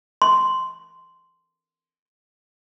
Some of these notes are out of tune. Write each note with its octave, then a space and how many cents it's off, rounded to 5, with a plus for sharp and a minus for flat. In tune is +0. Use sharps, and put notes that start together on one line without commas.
C6 -10